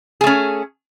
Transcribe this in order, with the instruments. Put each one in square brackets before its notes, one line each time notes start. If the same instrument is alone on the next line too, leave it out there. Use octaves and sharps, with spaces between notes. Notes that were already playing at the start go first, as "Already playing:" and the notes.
[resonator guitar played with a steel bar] G#4
A3
C#4